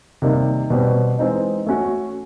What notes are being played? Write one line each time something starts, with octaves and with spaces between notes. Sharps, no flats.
C3 D#3 G3 A#3 D#4
B2 G3 C4
E3 G#3 C4 D#4
A3 C#4 F#4